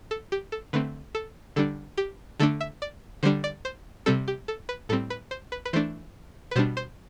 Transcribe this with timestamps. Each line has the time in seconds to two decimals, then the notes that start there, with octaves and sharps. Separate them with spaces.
0.11 A4
0.32 G4
0.52 A4
0.73 D3 A3 C4 B4
1.15 A4
1.56 D3 G3 D4 A4
1.97 G4
2.40 D3 A3 D4 A4
2.61 E5
2.82 D5
3.23 D3 G3 D4 C5
3.44 D5
3.65 C5
4.06 C3 G3 C4 A4
4.28 G4
4.48 A4
4.69 B4
4.89 A2 G3 C4 A4
5.10 B4
5.31 C5
5.52 B4
5.65 B4
5.73 E3 A3 D4 C5
6.51 B4
6.56 B2 G3 D4 C5
6.77 C5